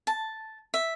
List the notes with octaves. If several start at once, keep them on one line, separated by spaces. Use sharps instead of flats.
A5
E5